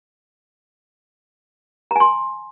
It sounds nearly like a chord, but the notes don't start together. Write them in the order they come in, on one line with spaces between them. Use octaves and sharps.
A#5 G#5 C6